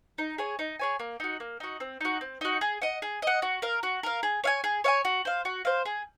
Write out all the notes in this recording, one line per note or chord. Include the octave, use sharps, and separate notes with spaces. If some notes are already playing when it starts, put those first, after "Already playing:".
D#4
G#4 C#5 G#5
D#4
G#4 C#5 G#5
A#3
D#4 F#4
A#3
D#4 F#4
C4
D#4 F#4
C4
D#4 F#4
G#4
D#5 F#5
G#4
D#5 F#5
F#4
A#4 F5
F#4
A#4 F5
G#4
C#5 F5 G#5
G#4
C#5 F5 G#5
F#4
C5 F5
F#4
C5 F5
G#4